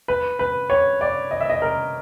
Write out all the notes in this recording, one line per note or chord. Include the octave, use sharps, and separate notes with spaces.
B4
B4
C#5
D5
D#5
E5
D#5
A#4